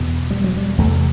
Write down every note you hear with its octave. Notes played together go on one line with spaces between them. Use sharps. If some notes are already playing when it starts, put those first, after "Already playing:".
Already playing: E2 B2
G3
F#3
G3
E2 C3 A3